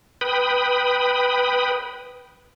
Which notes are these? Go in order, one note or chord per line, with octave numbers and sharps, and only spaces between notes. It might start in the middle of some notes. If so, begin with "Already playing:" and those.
B4 G5 B5 D#6